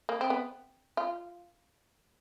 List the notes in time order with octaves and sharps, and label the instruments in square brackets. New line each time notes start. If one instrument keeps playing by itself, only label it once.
[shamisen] A#3
C4
B3
F4